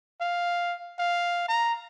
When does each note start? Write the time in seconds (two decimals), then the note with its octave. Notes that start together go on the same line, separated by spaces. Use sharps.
0.21 F5
0.99 F5
1.48 A#5